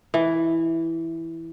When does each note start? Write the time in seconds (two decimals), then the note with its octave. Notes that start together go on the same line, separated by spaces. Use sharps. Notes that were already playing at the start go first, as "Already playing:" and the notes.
0.14 E3